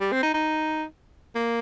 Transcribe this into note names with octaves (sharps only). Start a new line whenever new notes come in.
G3
C4
D#4
D#4
A#3